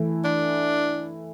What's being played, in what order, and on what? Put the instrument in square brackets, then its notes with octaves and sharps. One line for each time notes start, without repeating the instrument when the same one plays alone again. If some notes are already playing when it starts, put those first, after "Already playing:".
Already playing: [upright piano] E3 A3 E4
[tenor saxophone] D4